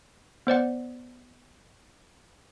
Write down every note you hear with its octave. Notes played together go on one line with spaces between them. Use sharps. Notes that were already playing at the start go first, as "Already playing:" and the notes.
B3 C5 D5 F#5